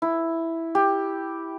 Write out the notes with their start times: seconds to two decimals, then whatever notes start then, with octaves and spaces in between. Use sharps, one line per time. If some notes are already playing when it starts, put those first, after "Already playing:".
0.02 E4
0.75 G4